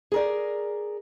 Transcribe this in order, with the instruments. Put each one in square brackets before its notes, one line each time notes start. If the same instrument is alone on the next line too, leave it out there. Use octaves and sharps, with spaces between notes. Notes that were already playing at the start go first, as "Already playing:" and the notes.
[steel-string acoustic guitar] G#4 A#4 D5